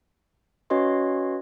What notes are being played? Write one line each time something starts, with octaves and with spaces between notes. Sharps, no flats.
C#4 F#4 B4 C#5 D#5 C6